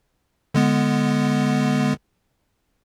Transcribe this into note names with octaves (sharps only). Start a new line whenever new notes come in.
D3 G#3 B3